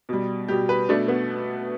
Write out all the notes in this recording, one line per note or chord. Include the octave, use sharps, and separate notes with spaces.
B2 G3
B2 G3 G4
B4
B2 A3 D4
B3